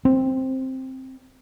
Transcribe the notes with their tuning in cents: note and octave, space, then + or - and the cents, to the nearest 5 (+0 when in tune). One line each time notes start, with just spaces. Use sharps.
C4 +5